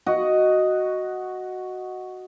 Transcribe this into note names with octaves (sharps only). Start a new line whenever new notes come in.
F#4 D#5